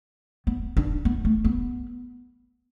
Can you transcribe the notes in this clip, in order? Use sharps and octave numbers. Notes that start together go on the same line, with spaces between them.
B3
D4
B3
A3
B3